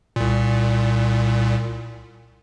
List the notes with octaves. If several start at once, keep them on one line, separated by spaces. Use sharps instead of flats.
C2 A#2